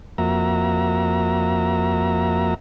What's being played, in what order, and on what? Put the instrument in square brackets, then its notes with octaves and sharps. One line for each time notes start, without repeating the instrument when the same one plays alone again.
[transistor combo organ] F2 A#3 F#4 E5 A#5